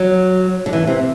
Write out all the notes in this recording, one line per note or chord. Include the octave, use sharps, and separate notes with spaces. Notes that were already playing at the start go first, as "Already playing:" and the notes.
Already playing: F#3
D3
E3
C3